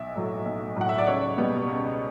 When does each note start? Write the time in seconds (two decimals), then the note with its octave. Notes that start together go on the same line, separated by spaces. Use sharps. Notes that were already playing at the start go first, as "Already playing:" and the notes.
Already playing: B1 E5
0.15 A2 F#3 A3
0.45 B1
0.76 A2 F#3 A3 F#5
0.89 E5
0.98 D5
1.06 C#2 C#5
1.37 B2 G3 B3
1.68 C#2